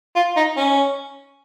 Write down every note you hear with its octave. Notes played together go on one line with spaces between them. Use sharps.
F4
D#4
C#4